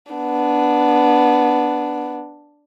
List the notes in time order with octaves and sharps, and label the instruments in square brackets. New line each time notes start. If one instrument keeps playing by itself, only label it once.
[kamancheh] B3 D4